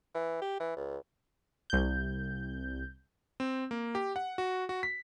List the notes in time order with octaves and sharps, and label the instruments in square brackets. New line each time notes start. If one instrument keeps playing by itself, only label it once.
[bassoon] E3
G4
E3
C#2
[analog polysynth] C2 G6
[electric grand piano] C4
A#3
G4
F#5
F#4
F#4
B6